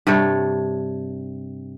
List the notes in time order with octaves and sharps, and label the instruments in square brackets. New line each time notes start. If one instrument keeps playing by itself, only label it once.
[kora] G2 C3 A4 C#5